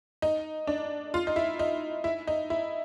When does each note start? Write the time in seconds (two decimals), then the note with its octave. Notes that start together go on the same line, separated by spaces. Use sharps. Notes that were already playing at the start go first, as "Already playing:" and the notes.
0.22 D#4
0.67 D4
1.14 F4
1.27 D#4
1.36 E4
1.59 D#4
2.04 E4
2.27 D#4
2.50 E4